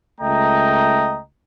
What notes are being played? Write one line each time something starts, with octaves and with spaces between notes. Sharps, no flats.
C#2 A3 D#5 G5 A#5